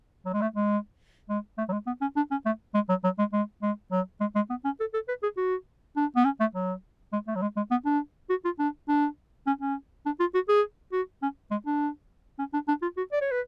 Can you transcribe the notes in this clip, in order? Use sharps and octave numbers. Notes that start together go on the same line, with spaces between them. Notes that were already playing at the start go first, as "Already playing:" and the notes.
F#3
G#3
A3
G#3
G#3
A3
F#3
G#3
B3
C#4
D4
C#4
A3
G#3
F#3
F#3
G#3
G#3
G#3
F#3
G#3
G#3
B3
C#4
A4
A4
B4
G#4
F#4
D4
B3
C#4
A3
F#3
G#3
A3
F#3
G#3
G#3
B3
D4
F#4
F4
D4
D4
C#4
C#4
D4
F4
F#4
G#4
F#4
C#4
G#3
D4
C#4
D4
D4
F4
F#4
D5
C#5
B4